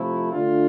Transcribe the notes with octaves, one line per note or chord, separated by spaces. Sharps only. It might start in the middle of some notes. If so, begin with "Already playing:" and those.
Already playing: C3 F3 A3 E4
D3 A3 D4 F4